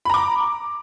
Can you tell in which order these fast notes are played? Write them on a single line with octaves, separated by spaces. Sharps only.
B5 A#5 D6